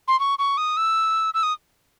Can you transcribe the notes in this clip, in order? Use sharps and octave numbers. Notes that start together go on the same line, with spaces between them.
C6
C#6
C#6
D#6
E6
E6
D#6